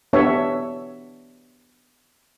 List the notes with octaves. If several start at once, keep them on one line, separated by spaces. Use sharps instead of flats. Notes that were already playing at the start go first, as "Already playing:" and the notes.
B3 D4 G4 C#5 E5 A5